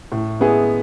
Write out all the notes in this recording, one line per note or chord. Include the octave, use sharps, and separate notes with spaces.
A2
G#3 B3 E4 G#4